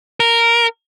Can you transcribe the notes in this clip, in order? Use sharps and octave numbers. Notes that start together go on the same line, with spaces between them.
A#4